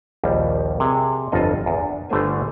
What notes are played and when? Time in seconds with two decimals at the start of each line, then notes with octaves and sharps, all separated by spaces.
0.24 A#1 D#2 G3
0.80 C3 G#4
1.32 G1 F2 F4 A4 D#5
1.66 E2
1.79 D4
2.10 G1 D3 G3 A3 C5 G#5